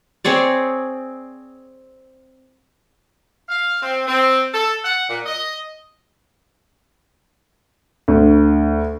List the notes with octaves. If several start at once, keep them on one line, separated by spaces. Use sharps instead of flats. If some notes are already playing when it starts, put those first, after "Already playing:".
C4 G#4 C#5 D5
F5
C4
C4
A4
F#5
A#2
D#5
D2